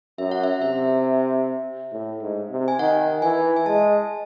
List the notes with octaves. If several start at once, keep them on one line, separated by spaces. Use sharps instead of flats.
F#2 E5
F#5
E5
C3 E5
A2
G#2
C3
G#5
D#3 F#5
E3 G#5
G#5
G#3 A5